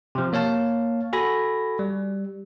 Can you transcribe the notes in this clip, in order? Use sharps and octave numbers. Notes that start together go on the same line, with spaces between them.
C3 F3
A#3 C#5 F5 A5
F#4 A4 G#5 B5 A#6
G3